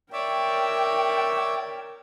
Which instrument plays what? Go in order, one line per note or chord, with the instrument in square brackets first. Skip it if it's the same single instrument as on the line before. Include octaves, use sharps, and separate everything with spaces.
[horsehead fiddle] A#4 G5 [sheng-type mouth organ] C#5 D5 E5